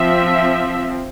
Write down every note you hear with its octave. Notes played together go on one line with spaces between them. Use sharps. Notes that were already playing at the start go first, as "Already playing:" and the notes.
Already playing: F3 C4 E5